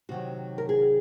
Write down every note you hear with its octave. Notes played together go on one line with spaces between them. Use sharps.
C3 D#3 F#3 F#4
A#4
G#4